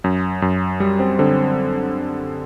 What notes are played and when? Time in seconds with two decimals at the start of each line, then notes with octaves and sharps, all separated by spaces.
0.04 F#2
0.42 F#2
0.80 G3
0.99 C4
1.18 D3 C4